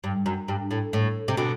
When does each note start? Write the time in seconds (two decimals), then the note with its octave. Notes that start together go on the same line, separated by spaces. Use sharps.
0.04 G2
0.26 F#2
0.48 G2
0.71 A2
0.93 A2
1.28 C3
1.37 B2 D3